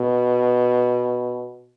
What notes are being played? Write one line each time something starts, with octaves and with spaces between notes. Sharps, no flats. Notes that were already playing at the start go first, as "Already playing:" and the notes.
Already playing: B2